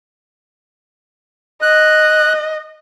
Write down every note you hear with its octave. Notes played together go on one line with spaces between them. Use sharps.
D#5 F#6